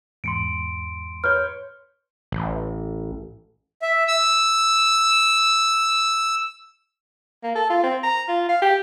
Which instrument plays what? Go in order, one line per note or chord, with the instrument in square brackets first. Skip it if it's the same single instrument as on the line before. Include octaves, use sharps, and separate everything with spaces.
[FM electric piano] E2 G#2 [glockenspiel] C6 C#7 D7
[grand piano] B4 C#5 G6 [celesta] F6
[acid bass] A1
[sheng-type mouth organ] E5
E6
[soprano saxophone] A#3
A4
F4
C4
A#5
F4
F5
G4